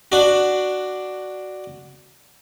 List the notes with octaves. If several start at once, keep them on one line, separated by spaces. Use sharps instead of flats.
D4 F#4